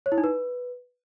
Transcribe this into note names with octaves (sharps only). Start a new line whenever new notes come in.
C#5
E4
D#4
B4